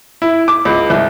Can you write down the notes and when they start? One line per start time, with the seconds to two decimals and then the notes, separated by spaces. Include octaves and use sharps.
0.22 E4
0.48 D6
0.65 C#2
0.90 C2